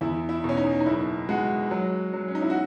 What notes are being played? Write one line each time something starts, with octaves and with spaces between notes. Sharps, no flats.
E2 E4
E4
B2 C#4
D#4
D#4
F#1 E4
G#3 F#4
F#3
F#3
C#4
D#4
E4
F#4